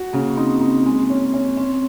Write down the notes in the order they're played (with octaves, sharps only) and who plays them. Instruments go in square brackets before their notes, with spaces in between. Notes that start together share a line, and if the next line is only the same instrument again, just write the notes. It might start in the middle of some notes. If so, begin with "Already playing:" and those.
Already playing: [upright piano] F#4
[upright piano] C#3 [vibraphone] A#3
[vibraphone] C4 [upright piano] D#4
[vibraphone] C4 [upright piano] D#4
[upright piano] G#3
C#4
C#4
[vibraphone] C4 [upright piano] C#4